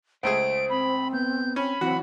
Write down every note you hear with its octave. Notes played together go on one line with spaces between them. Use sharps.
C#2 A3 G#4 C5 D7
C4 B5
B3 G6
C4 C#4 B5
E3 F#3 C4 F#4 F#5